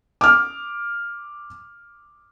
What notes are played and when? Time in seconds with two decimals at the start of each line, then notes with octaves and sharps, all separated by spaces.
0.21 D6 F6